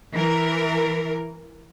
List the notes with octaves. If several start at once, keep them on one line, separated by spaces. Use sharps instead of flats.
E3 A#4